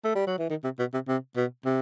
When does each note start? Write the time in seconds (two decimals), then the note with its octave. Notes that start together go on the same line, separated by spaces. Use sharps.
0.04 A3
0.15 G3
0.27 F#3
0.39 E3
0.50 D#3
0.64 C3
0.79 B2
0.94 C3
1.08 C3
1.37 B2
1.65 C3